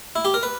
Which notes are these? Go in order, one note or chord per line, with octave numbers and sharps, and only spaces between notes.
E4
G4
A#4
B4